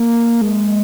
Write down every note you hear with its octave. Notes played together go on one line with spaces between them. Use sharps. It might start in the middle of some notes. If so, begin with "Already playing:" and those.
Already playing: A#3
G#3